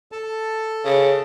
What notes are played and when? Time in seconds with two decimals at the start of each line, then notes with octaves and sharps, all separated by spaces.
0.12 A4 A5
0.85 C#3